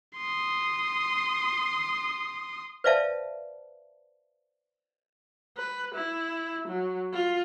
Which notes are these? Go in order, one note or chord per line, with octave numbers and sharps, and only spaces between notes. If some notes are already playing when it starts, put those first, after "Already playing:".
C6 D#6
B4 C5 D5 E5 F5 A5
B4
E4
F#3
F4